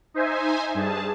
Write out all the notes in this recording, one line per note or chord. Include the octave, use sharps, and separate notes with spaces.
D#4 C5 E5 G#5
G2 G#4 A5